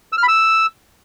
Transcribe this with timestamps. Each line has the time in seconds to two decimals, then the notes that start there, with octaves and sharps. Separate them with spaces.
0.12 E6
0.18 F6
0.23 B5
0.28 E6